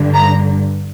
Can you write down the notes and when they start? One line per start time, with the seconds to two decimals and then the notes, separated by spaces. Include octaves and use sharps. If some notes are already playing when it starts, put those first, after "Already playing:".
Already playing: G2 D3
0.14 A#5